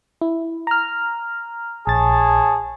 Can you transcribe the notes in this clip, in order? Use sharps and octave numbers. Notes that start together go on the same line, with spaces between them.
E4
A#5 F6
A#1 G#4 C#5 A5 A6